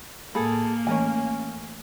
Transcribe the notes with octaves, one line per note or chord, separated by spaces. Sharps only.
A2 A#3 G#4 A4 B5
E3 A3 C#4 A#4 C#5 G#5